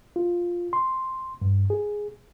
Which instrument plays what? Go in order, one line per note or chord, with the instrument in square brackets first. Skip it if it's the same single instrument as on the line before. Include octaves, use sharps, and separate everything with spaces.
[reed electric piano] F4
C6
G2
G#4